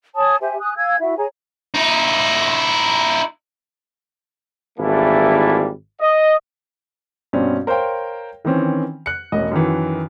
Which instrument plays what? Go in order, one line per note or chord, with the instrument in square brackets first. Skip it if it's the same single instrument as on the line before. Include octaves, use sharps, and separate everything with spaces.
[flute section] C#5 G#5 A5 D#6
G4 C5 E5 G#5
G#5 D#6 F#6
F5 G#5 E6 G#6
E4 F#4 E5
G#4 C#5 G#5 A#5
[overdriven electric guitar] D#4 E4
[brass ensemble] G#1 E3 G3 A3 A#3 E4
D#5
[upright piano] G2 B2 G3 C4 C#4
A#4 C5 C#5 F5 G5
D#3 E3 C4 C#4
F#6 C#7
E1 A1 D#5
F#2 D#3 E3